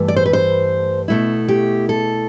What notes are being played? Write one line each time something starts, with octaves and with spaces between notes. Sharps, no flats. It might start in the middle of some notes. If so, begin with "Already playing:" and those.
Already playing: G2 E3 A3
D5
C5
B4
C5
B2 A3 E4
G4
A4